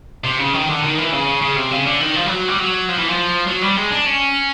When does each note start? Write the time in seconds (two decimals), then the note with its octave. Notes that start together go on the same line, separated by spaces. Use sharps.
0.24 C3
0.39 C#3
0.54 D#3
0.68 D3
0.83 D#3
0.97 E3
1.12 C#3
1.41 C#3
1.56 C3
1.71 C#3
1.86 D3
2.00 D#3
2.15 F3
2.26 G3
2.29 F#3
2.48 G3
2.59 F#3
2.89 F3
2.98 E3
3.08 F3
3.47 F#3
3.62 G3
3.76 G#3
3.91 D4
4.06 C#4